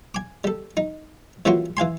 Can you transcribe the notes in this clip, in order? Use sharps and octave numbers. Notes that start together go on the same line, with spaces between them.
G#5 D6
G3 A4
D#4
E3 G3 A#3 C#4 F4 F#4
E3 F5 G#5 C6